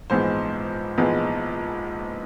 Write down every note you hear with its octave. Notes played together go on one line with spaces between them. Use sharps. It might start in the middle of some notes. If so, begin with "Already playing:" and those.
A#1 G#2 E3 G#3 B3 C5
A#1 G#2 E3 G#3 B3